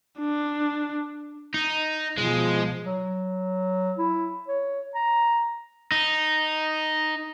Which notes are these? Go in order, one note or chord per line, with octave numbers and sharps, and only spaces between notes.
D4
D#4
B2 F3 G#3
F#3
E4
C#5
A#5
D#4